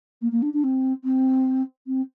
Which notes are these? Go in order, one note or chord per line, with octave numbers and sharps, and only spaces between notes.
A#3
A#3
D4
D4
C4
C4
C4